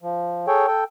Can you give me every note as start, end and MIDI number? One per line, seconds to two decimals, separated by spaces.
0.02 0.46 53
0.48 0.67 68
0.48 0.67 69
0.48 0.67 73
0.48 0.67 79
0.67 0.84 69
0.67 0.84 79